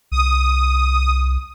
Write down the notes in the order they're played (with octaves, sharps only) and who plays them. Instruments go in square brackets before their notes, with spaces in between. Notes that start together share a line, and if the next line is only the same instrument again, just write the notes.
[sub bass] C2 [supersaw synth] D#6